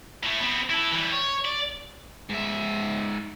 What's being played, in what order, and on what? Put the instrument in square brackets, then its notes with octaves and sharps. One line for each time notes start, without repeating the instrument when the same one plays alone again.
[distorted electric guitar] A2 A3
B3 C4
E4 A4
E3 G3
C#5
D5
G#2 E5